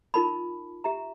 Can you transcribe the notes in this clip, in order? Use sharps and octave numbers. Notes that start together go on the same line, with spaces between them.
D#4 F4 A#4 A5 B5
G4 E5 A#5